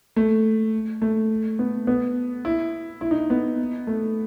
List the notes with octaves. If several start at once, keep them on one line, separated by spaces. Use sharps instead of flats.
A3
A3
B3
B3
E4
E4
D#4
B3
A3